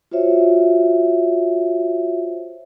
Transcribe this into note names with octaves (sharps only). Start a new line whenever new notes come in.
F4 F#4 C5 C#5 E5